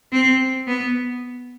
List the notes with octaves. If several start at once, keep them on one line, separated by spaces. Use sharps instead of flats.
C4
B3